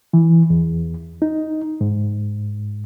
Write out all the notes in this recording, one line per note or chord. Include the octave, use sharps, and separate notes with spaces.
E3
E2
D#4
G#2